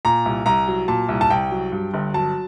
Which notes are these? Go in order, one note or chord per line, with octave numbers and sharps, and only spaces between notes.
A#2 A#5
C2
C2 A#5
F#3
A#2 A5
C2
A5
C2 G5
F#3
G2
G1
F#3 A5